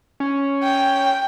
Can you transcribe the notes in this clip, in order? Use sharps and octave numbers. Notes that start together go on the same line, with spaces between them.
C#4
G5